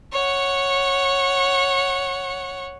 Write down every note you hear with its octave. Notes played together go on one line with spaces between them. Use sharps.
C#5 F#5